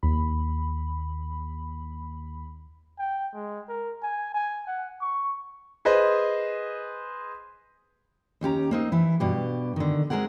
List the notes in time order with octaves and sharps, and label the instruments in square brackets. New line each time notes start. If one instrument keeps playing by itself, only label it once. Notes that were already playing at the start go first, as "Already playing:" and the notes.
[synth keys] D#2 B5
[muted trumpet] G5
G#3
A#4
G#5
G#5
F#5
C#6
[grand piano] G#4 B4 C5 D#5
[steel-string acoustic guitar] D#2 C#4 G4 A#5
A#3 C4 D#4
E3 E4
G2 B2 G4
D3 D#3
G#3 C4 G#4 A#4 F#5